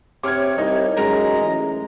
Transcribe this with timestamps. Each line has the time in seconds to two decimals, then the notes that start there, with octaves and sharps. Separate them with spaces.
0.23 C3 C#5 D6 F6 G#6
0.58 C2 D#4
0.97 F#2 G#3 A#5
1.39 A1